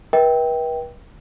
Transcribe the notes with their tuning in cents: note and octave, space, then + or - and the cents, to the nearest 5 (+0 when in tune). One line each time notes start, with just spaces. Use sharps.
B4 -40 E5 -40 G5 +0